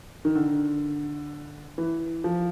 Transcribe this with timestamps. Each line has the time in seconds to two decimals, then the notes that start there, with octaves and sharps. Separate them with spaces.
0.25 D#3
0.35 D3
1.78 E3
2.24 F3